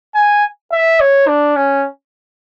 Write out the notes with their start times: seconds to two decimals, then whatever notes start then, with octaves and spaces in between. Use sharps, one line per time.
0.14 G#5
0.72 E5
1.00 C#5
1.28 D4
1.56 C#4